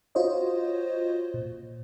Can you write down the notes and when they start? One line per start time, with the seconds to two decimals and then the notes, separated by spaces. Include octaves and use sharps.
0.15 F4 F#4 C5 C#5 D#5
1.34 A#2